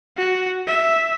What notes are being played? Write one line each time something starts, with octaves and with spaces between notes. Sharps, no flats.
F#4
E5